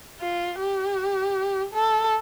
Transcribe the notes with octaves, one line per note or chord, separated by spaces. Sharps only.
F4
G4
A4